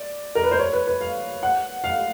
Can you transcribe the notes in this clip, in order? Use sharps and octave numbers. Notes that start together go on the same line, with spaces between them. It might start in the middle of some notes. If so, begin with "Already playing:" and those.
Already playing: D5
A#4
B4
C5
C#5
B4
B4
F5
F#5
F5